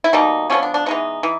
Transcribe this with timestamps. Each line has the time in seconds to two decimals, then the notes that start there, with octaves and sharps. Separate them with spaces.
0.04 E4
0.13 B2 G3 A#3 D#4
0.50 D3 F3 G#3 B3 C#4
0.63 D4
0.74 D4
0.86 E3 G#3 B3 D#4
1.23 E3